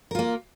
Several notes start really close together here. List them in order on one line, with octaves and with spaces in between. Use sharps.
A#4 F4 A#3